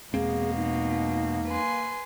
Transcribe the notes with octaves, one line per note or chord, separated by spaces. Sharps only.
E2 B2 G#3 A#3 C4 G#4
D#4
B4 G#5 C6